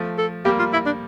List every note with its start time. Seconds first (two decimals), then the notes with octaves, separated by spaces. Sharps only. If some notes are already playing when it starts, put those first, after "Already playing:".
Already playing: F3 A3
0.18 A4
0.45 G3 A#3 G4
0.59 F4
0.73 E4
0.86 D4